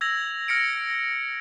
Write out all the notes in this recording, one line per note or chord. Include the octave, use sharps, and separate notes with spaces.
E6 G#6 A#6 F7 F#7
F6 A#6 C#7 D7